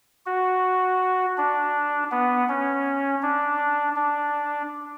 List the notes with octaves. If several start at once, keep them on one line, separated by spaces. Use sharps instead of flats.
F#4
D4
B3
C#4
D4
D4